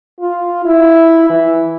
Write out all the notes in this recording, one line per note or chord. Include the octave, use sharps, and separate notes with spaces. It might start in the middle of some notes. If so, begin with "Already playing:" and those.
F4
E4
E3